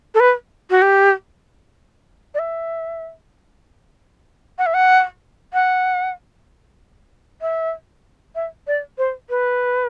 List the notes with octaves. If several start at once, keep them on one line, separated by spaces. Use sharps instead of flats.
A4
B4
F#4
G4
D5
E5
F#5
E5
F#5
F#5
E5
E5
D5
C5
B4